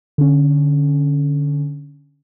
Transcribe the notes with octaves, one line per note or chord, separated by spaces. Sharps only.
D3 C#4